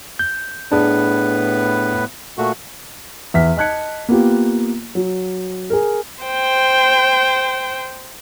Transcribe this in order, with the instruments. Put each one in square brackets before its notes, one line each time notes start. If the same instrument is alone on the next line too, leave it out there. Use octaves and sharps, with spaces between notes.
[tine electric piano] G6
[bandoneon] A2 B3 B4 [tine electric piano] D4 G#4
[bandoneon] A#2 A3 F#4
[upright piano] E2 E5 F6 B6
D#5 A5 F#6 G#6 C#7
A#3 B3 F4 G4
F#3
G#4 A#4
[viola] C5 G5